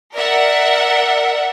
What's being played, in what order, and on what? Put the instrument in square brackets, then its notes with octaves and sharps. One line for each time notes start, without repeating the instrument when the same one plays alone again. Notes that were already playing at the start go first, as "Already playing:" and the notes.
[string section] A#4 E5 F#5 [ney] D5